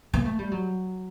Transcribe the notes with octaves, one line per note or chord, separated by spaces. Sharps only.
A#3
A3
G3
F#3